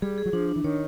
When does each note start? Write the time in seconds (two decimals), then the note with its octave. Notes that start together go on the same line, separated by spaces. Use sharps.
0.02 G3 G#4
0.18 G#4
0.26 F#3
0.33 F3 D4
0.49 D4
0.56 E3
0.64 D#3 C#5